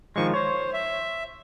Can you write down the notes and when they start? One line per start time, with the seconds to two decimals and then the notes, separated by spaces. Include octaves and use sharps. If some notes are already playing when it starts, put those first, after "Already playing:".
0.16 D#3 F3 G#3 C#6
0.34 C5 C#5
0.73 E5